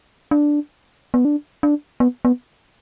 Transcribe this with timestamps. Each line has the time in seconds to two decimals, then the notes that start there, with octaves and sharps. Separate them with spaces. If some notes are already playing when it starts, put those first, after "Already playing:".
0.31 D4
1.14 B3
1.25 D4
1.63 D4
2.00 B3
2.25 B3